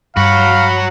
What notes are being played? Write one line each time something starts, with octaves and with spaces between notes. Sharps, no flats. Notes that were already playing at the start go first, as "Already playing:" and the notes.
G2 F#4 C#5 F5 B5